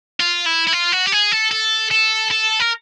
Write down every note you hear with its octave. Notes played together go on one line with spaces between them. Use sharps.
F4
E4
E4
F4
F#4
G4
G#4
A4
A4
A4
A4
A#4